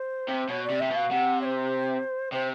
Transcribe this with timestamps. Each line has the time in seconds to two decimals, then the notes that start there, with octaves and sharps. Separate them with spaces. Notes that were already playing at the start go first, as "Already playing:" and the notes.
Already playing: C5
0.29 C3
0.49 B2 C#5
0.64 D5
0.70 C3
0.80 C3 E5
0.91 B2 F5
1.10 C3 F#5
1.41 C#5
1.45 C5
2.32 C3 C5